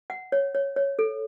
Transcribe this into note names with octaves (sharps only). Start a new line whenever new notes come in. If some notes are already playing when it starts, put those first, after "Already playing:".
F#5
C#5
C#5
C#5
A4